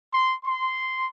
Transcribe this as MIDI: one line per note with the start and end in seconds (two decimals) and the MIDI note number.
0.13 0.35 84
0.44 1.06 84